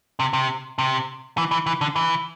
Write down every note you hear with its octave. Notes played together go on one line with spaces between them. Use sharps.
C3
C3
C3
E3
E3
E3
D3
E3